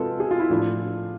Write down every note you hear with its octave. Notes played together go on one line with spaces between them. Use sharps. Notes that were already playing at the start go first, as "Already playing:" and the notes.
Already playing: C3 G#3 C4 F4 A4 B4
G#4
F4
E4
A2 F3 A3 D4 F4